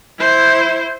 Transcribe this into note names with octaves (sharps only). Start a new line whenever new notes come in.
E4 C5